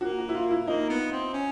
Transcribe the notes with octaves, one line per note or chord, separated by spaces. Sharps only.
A#3 F#4
F#4
E4
F4
E4
A#3 D#4
B3
C4
C#4